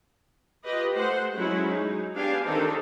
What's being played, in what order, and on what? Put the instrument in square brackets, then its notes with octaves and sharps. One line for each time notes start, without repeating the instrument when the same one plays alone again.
[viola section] F4 G4 B4 D#5
A3 C5 F#5
F#3 G#3 C#4 E4 F#4
D#4
B3 D4 G4 F5 G#5
D#3 C4 D4 D#4 A4 A#4